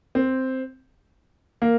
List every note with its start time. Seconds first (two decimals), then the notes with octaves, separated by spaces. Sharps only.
0.15 C4
1.62 A#3